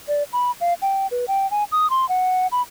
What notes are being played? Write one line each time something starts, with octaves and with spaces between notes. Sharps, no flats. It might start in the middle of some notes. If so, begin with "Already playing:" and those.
D5
B5
F5
G5
B4
G5
G#5
D#6
C6
F#5
B5